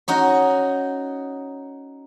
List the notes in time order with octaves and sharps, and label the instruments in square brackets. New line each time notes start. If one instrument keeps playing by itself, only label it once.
[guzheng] C#4 D#4 F#4